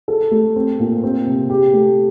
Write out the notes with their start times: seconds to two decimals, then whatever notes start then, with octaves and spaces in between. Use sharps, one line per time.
0.08 A4
0.31 A3
0.56 C4
0.79 A#2
1.03 C4
1.26 C3
1.50 G4
1.73 A3